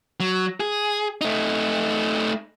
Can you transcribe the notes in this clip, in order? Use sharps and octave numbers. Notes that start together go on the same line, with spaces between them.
F#3
G#4
A3 D#4